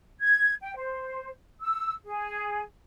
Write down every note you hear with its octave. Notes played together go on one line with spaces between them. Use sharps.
G#6
G5
C5
E6
G#4